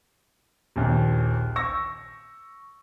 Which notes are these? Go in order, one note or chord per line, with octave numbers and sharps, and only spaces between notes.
A#1 D#2
C#6 E6 A#6